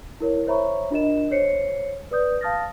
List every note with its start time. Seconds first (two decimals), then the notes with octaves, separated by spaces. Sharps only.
0.20 E4 A#4 C#5
0.47 C5 C#5 E5 A#5 B5 C#6
0.91 D4 F4 A#4 D#5 E7
1.31 C5 C#5 C7 C#7
2.11 B4 D5 D#6 G6
2.41 F5 A5 D#6 F6 A6 A#6